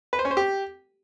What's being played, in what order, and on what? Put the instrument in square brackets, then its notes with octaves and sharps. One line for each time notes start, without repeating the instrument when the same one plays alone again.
[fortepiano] B4
C5
C#4
C5
G4